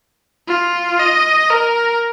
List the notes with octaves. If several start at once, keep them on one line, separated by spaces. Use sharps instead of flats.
F4
D#5
A#4